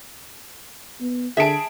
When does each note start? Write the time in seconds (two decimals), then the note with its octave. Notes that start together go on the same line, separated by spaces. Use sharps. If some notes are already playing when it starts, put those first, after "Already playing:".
1.01 B3
1.37 D3 G#4 E5 A5 D7